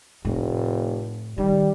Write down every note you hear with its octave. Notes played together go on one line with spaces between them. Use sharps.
F1 A2
D#3 G3